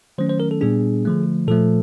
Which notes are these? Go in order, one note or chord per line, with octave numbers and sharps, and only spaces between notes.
D#3 F#3 A3 C#4 C5
C5
A#4
A4
A#2 G3 B3 D4 G#4
D3 F3 A3
A#2 F3 A3 A4